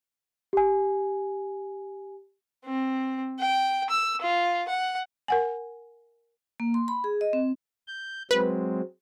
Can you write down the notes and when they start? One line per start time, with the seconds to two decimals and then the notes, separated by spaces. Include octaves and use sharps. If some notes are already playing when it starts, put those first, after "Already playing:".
0.53 G4 G#5
2.66 C4
3.40 G5
3.90 E6
4.22 F4
4.68 F#5
5.28 A#4 F#5 G#5
6.60 A#3
6.74 C6
6.88 B5
7.04 G#4
7.21 D#5
7.33 C4
7.87 G6
8.31 F#3 G#3 C4 B4